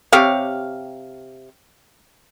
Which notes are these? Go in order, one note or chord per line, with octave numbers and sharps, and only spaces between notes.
C3 G4 C#5 F5